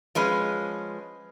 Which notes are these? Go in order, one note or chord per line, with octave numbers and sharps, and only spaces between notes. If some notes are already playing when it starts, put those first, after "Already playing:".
F3 G#3 C#4 B4